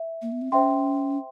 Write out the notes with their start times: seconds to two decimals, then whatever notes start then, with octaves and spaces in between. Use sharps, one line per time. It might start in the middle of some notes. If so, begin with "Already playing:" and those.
Already playing: E5
0.22 A#3
0.32 B3
0.41 C4
0.52 C#4 C5 E5 G5 C6